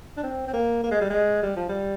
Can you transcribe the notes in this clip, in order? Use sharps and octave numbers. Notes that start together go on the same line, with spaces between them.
D4
C4
C4
A#3
A#3
G#3
G3
G#3
G3
F3
G3